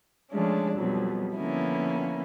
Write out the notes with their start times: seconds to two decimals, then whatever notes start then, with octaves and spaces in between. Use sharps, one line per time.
0.31 F3 G#3 A3 C#4 D4
0.77 F2 B2 F#3 G3
1.36 D3 F3 A#3 B3 C#4 E4